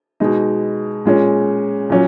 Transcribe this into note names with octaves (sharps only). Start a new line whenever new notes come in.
B2 G#3 D#4
A#2 G#3 C#4
A#2 F#3 C#4